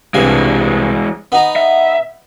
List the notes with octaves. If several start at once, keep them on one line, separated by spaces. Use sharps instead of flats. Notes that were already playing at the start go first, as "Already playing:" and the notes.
C2 G2 E3 G#3 G#5
B3 D#4 A#5
E5